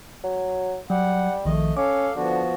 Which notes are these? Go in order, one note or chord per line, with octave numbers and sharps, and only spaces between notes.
F#3
F#3 G3 F#5
A#1 D#3 F3 A3 D#5
C#4 A4 F5 D6
D3 F3 B3 F#4